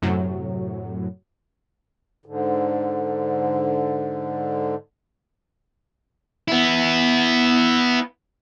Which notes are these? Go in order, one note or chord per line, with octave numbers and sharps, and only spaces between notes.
F#2 A2 C3 F#3
G#2 D3
B3 E4